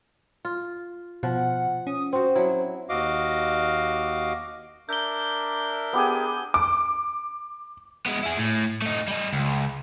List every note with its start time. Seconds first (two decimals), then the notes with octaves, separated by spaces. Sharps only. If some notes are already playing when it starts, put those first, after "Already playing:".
0.45 F4
1.23 B2 F3 F#5
1.87 C#4 D#6
2.13 C4 F#4 C5
2.35 F#3 E4
2.89 D#2 F#4 D#5 F5 D6
4.89 D4 A#4 E5 G6 G7
5.93 B3 G4 G#4
6.54 D6
8.06 G#3 B3
8.23 E4 G#4
8.37 A2
8.82 A3 D#4
9.08 G3 D#5
9.33 C#2